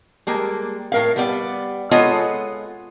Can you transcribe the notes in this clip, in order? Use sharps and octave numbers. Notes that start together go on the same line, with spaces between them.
G3 G#3 A#3
A2 A#4 F5
G3 B3 D5
G#3 B3 F4 A4 C#5 D#5